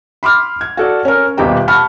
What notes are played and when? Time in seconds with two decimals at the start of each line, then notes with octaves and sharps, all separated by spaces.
0.23 B5 C6 D6 F6
0.61 G#6
0.77 F#4 A4 D5
1.05 C#4 A#4
1.37 D#1 B2 G4 G5 A#5
1.68 F#5 A5 B5 C#6 F6